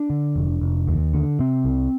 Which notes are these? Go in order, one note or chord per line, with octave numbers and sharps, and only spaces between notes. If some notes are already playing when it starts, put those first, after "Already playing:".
Already playing: D4
D3
F1
F1
D#2
D3
C3 C4
C2